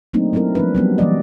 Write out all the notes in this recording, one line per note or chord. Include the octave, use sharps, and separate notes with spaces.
F#3 A3 A#3 C4 D4 D#4
F#3 B3 C4 E4 A#4
F3 G#3 C4 D4 B4
F#3 G3 B3 C#4
E3 F#3 G3 A#3 D5 D#5